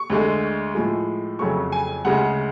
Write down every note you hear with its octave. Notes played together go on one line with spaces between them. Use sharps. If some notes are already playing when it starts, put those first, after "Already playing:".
Already playing: C#6
D2 D3 G#3
A2 F3 G#3
F2 C#3 F#3 A3 C#6
G#5
D2 C#3 G#3 F#5